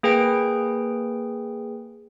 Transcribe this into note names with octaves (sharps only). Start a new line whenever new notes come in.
A#3 G#4 B4 G5 D7